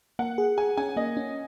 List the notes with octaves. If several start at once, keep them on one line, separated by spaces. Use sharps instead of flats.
A#3 F#5
G#4
G#4 G#5
C#4 G#5
A#3 D#5
C#4